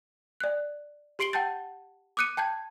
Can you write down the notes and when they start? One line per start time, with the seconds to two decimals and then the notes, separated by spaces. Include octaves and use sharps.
0.40 D5 F#6
1.19 G4 C6 C7 D7 F#7 G7
1.33 F#5 G5 A5 G6 A6
2.17 D6 D#6 F#6 C#7 D#7
2.37 G5 A5 G6 G#6